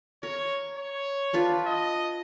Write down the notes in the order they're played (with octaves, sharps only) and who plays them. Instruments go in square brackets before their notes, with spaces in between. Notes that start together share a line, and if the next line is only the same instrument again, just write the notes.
[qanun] A#4 [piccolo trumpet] C#5
[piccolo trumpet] C#5
[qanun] D4 F4 B4
[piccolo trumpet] D#5